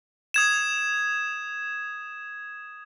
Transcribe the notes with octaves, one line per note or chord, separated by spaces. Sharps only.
D#6 G#6 E7